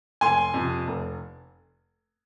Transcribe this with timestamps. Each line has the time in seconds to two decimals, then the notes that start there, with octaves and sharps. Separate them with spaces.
0.21 F1 G#5 C6
0.54 F2 C3
0.87 F1